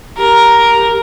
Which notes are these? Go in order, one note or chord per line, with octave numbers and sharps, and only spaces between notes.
G4 A#4